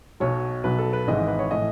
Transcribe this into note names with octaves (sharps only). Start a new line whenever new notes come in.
B1 B2 F#3 C#5
B1 B2 F#3 B4
A4
B4
G#1 G#2 E3 D#5
B4
C#5
A2 E3 D#5